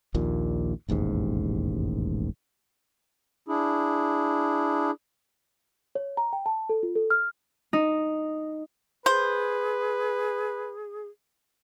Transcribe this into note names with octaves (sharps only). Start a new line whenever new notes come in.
A#1 D#2 A#2
E1 A1 D#2 G#2
D4 E4 G#4
C#5
A#5
G5
A5
A4
F4
A4
F6
D#4
G#4 B4 C5